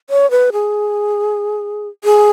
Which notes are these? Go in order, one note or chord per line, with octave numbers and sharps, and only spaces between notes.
C#5
B4
G#4
G#4